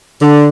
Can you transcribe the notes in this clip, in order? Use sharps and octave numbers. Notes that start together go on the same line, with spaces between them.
D3